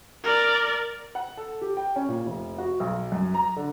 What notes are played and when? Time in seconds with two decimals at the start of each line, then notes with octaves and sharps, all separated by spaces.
0.24 A#4 D5
1.15 F#5
1.37 A4
1.61 G4
1.77 G5
1.96 C#4
2.08 A#2
2.26 F1
2.58 F#4
2.80 B1
3.12 F#2
3.34 A#5
3.56 D3